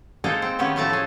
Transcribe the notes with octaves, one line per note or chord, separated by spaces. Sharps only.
G#3 A#3 D#4 A4 C5
C4
D#3 B3 C#4 G4
A2 F3 A3 A5 A#5
G#4 A4